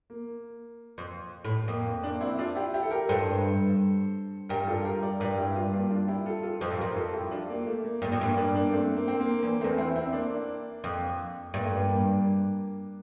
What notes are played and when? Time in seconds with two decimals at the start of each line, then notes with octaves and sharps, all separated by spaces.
0.10 A#3
0.98 F2
1.45 A2
1.68 F2 A#3
2.04 A#3 D4
2.21 C4 E4
2.39 D4 F4
2.56 E4 G4
2.74 E4 G4
2.83 A4
2.91 G4 A#4
3.09 G2 A4 C5
4.49 G2 G4 A#4
4.60 A#4
4.67 F4 A4
4.85 G4 A#4
5.02 A#4 D5
5.20 G2 A#4 D5
5.38 E4 G4
5.55 D4 F4
5.73 A#3 D4
5.91 D4 F4
6.08 E4 G4
6.26 F4 A4
6.43 F4 A4
6.61 F2 A4 C5
6.71 G2
6.78 F2 G4 A#4
6.96 F4 A4
7.14 E4 G4
7.31 D4 F4
7.49 A#3
7.67 A3
7.85 A#3
8.02 G2 A#3
8.12 F2
8.19 G2 A#3
8.37 A#3 D4
8.54 A#3 D4
8.72 A3 C4
8.97 A#3
9.08 C4
9.20 A#3
9.43 E2 A#3
9.61 E2 A3 C4
9.78 C4 E4
9.96 C4 E4
10.13 A#3 D4
10.84 F2
11.54 G2 A#3 D4
11.63 A3
11.72 A#3
11.89 A#3 D4
12.07 A#3 D4